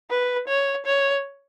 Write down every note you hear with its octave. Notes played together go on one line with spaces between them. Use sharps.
B4
C#5
C#5